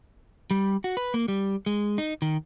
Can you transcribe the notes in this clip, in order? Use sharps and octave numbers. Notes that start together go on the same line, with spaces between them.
G3
F#4
B4
A#3
G3
G#3
D#4
D#3